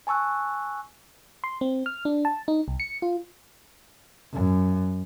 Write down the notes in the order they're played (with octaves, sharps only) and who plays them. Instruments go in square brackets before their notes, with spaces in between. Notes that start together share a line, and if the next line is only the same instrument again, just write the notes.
[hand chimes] G#5 A5 C#6 E6 F#6
[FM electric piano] C6
C4
F6
D4
A5
D#4
C2
C#7
F4
[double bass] F#2